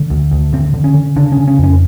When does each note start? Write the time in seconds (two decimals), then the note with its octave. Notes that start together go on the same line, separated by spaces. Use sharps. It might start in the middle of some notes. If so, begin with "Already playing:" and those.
Already playing: D3
0.10 D2
0.32 D2
0.53 D3 C4
0.74 D3
0.84 C#4
0.94 D3
1.16 C#3 D4
1.32 C#4
1.37 C#3
1.48 C#4
1.59 F2 C#4